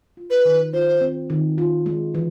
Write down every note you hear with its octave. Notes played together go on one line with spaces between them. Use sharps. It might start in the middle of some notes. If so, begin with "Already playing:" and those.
F4
B4
D#3
F4 C5
C4
D#3
F4
G#3
E3